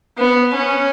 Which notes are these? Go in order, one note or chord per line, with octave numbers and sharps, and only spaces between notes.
B3
C#4